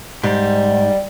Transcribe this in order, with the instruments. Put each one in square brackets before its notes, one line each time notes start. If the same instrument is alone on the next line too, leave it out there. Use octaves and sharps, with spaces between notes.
[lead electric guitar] G#2 [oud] G3